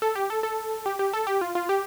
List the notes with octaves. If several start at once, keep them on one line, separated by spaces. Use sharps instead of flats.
A4
G4
A4
A4
G4
G4
A4
G4
F4
F4
G4